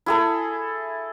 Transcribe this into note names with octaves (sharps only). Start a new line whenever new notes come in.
E4 G#4 A4